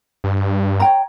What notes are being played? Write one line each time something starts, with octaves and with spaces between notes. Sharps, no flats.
G2
C#5 G5 A#5